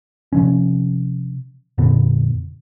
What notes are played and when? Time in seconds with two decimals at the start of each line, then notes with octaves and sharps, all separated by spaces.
0.33 C3 F3 C#4
1.78 F2 A#2 D3 B3